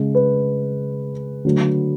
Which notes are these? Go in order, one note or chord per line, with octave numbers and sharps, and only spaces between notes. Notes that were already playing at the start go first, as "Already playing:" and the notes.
Already playing: C#3 G#3
B4
D3 F#3 A3